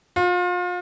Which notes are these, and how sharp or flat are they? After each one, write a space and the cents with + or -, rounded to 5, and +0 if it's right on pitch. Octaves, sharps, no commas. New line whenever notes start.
F4 +35